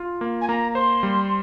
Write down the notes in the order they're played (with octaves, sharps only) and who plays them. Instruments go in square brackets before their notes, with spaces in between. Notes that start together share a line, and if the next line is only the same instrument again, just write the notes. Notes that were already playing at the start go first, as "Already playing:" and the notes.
Already playing: [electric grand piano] F4
A#3
[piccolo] G#5
[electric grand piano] A#3 [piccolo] A#5
[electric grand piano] C5 [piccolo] C6
[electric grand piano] G3